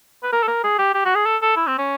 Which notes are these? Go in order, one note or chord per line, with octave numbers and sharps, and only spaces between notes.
B4
A#4
A4
A#4
G#4
G4
G4
F#4
G#4
A4
A4
E4
C4
C#4